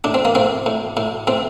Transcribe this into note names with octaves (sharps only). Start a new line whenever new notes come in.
A2 D4
C4
A#3
A2 C4
A2
A2
A2 C4